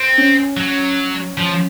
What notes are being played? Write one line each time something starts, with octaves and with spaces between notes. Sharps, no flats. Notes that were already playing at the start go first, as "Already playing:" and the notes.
Already playing: C4
C#4
F#3
F3